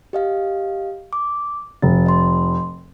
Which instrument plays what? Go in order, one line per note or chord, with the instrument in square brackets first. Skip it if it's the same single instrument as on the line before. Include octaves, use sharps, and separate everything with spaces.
[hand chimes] G4 D#5 F5
D6
[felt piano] F1 [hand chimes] A6
[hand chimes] D#5 C6